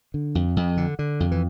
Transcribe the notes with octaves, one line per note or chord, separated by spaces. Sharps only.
D3
F2
F2
D3
D3
F2
E3